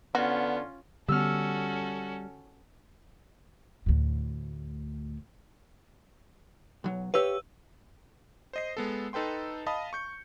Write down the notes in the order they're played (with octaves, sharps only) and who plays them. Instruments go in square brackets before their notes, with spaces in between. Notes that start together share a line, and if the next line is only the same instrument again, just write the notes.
[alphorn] D3 [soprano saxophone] B3 [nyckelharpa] C#4 F4 [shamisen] F#4
[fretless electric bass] D3 B3 [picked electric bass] G3 [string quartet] C#4 F#4 A4 [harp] E6 F6
[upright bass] D2 A2
[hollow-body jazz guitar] B1 F#3
[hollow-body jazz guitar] G4 C#5 F5 [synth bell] B4 E6
[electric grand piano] C5 D#5 C7
G#3 B3 A4
D#4 A4 B4 G5 C6
D#5 F5 A5 B5 D#6
C#6 G6 C#7